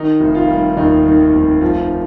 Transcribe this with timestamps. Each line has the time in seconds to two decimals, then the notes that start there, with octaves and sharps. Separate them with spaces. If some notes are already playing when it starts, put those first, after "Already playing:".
Already playing: D#3 D#4
0.20 F1
0.35 F4
0.48 G3
0.77 D#2 D#4
1.05 D#3
1.33 F1
1.61 F3